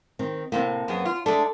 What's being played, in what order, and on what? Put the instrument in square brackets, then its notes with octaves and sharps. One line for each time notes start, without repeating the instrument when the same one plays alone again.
[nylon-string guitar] D#3 C4
[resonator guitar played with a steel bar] A2 C3 [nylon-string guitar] A#3 C4
[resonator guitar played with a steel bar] F#2 B3 G#4
F4
[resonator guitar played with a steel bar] G#3 A3 D4 [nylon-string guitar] A4